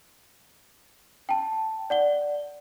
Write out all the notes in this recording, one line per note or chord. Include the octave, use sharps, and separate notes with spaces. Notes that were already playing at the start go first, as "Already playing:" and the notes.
G5 A5
D5 F#5 G7